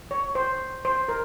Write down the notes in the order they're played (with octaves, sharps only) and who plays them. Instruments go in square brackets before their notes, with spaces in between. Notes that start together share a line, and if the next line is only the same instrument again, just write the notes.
[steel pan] C#5
C5
C5
A#4